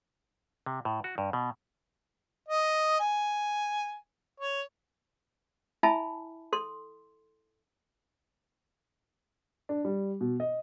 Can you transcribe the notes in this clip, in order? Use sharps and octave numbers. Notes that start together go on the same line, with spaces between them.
C3
A2
F#4
G2
B2
D#5
G#5
C#5
E4 E5 G#5 A5 B5
A4 C6
D4
G3
B2
D#5